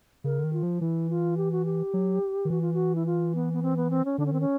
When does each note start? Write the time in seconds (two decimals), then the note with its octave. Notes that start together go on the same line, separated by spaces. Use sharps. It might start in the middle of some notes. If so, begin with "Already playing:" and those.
0.24 C#3 A#4
0.39 D3
0.44 D#3
0.53 F4
0.63 F3
0.80 E3 E4
1.10 F4
1.37 G4
1.52 F#4
1.65 G4
1.94 F#3
2.45 D#3
2.50 E3 F#4
2.61 F4
2.74 F#4
2.95 E4
3.06 F4
3.35 B3
3.53 B3
3.62 C4
3.77 B3
3.90 C4
4.05 C#4
4.18 D3 D4
4.26 C#4
4.32 D#3 C4
4.40 C#4